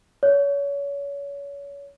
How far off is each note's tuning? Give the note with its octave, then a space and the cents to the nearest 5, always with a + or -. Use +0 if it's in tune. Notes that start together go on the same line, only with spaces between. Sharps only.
C#5 +30